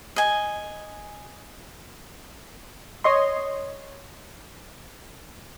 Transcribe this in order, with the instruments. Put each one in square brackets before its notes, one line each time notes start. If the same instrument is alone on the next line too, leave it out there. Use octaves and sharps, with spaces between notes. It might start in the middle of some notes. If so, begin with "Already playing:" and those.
[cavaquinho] D#5 G#5
[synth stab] C#5 D#5 C6